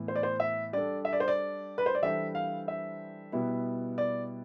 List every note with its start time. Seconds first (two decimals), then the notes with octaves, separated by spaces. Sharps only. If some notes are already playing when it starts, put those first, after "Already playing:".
Already playing: A2 E3 B3
0.08 C5
0.16 D5
0.23 C5
0.40 E5
0.73 G3 D4 A4 D5
1.05 E5
1.13 D5
1.20 C5
1.28 D5
1.78 B4
1.86 C5
1.95 D5
2.02 E3 G3 D4 A4 C5 E5
2.35 F5
2.68 E5
3.32 B2 G3 B3 E4
3.98 D5